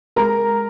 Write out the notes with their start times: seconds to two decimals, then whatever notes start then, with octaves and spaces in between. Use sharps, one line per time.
0.16 G#3 A#4 A#5